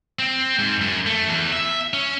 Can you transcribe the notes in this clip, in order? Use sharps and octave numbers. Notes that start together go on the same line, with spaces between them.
C4
G#2
F#2
A3
E2
E5
C#4